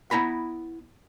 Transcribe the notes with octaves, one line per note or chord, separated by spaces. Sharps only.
B3 E4 A#5 B5